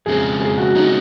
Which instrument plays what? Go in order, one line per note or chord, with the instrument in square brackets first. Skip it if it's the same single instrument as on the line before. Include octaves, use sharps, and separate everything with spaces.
[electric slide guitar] F2 C#3 F3 G#3 C4 [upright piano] G#4
[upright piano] G#4
F#4
[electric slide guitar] C#3 F3 G#3 C4 [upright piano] D#4